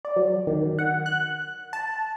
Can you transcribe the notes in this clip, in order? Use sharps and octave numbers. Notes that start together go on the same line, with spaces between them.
D5
F#3
D#3
F#5
F#6
A5